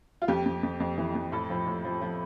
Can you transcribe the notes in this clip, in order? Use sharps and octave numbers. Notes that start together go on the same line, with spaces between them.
F4
F2 G4
F2
F2
F2
E3
F2
A2 A4
F3
A2
F3
F3